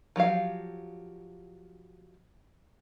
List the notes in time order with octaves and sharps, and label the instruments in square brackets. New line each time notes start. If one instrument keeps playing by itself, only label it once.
[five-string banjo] F3 F#3 G4 F5